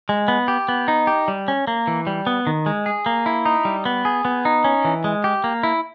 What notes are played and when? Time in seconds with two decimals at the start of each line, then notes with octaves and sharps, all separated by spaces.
0.09 G#3
0.28 B3
0.48 G4
0.69 B3
0.88 D#4
1.07 G4
1.28 G3
1.48 C#4
1.67 A#3
1.87 E3
2.07 G3
2.27 B3
2.47 D#3
2.66 G#3
2.86 G#4
3.06 A#3
3.26 E4
3.46 D#4
3.65 G3
3.86 B3
4.05 G#4
4.25 B3
4.45 D#4
4.64 C#4
4.85 E3
5.04 G#3
5.24 G4
5.44 A#3
5.63 E4